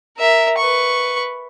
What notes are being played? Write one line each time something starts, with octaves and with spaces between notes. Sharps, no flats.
A#4 E5
B4 C#6